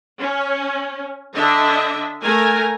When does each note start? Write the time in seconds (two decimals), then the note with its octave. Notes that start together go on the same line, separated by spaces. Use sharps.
0.21 C#4
1.36 D3 D4 D#5 E5
2.21 A3 A#4 G#5 A#5